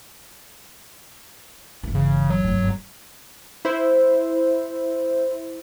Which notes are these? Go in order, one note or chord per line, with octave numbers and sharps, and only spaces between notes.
G1 E3
C#3
F#3
G1 A2
G1
E4 C5